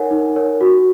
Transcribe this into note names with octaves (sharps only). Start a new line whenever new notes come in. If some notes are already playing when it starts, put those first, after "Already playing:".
Already playing: D#4 A#4 C#5 F#5 G#5
D#4
A#4 C#5
F#4